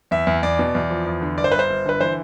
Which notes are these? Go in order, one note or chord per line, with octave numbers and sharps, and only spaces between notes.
E2 E5
E2
E2 D5
B2
E2
F3
E2
D3
G1 D5
C5
G1 B4
C5
G1
D3 B4
E3 C5